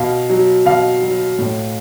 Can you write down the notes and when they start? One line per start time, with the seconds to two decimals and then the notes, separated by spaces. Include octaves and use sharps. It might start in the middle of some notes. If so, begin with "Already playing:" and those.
Already playing: B2 F5
0.30 F#3
0.65 B2 F5
1.01 F#3
1.38 A2